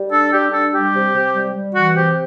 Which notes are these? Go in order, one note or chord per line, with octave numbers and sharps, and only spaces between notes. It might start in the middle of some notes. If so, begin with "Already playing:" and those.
Already playing: G3
D4 A4
G3 G4
D4 A4
G3 G4
C3
C3
G3
G3
E3 F#4
C3 G4